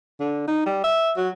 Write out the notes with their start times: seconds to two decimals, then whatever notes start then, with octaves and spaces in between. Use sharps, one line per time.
0.20 D3
0.48 D#4
0.66 G3
0.84 E5
1.17 F#3